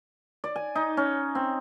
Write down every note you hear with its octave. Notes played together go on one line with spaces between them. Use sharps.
D5
G#5
D#4
C#4
C4